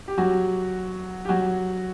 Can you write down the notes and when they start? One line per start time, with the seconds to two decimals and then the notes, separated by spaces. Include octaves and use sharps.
0.08 G4
0.18 F#3 F#4
1.25 G4
1.29 F#3 F#4